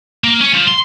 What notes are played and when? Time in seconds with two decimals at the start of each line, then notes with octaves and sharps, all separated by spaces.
0.24 A#3
0.41 C#4
0.54 F3
0.68 C6